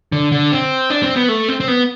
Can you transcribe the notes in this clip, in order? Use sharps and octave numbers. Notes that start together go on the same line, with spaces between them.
D3
D3
C4
D4
C4
B3
A3
C4
C4
B3